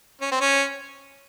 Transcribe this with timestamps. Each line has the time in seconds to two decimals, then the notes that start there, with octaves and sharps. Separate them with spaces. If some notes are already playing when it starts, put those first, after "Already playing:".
0.21 C#4
0.32 C4
0.41 C#4